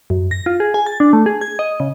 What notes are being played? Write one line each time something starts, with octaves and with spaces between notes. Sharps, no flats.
F#2
A#6
F4
G#4
G#5
A6
D4
A3
G#4
G#6
D#5
C#3